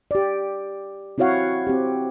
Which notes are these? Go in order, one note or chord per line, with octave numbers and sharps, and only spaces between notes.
G4 D5
C4 E4 F#4 C#5 F5 F#5
C4 G4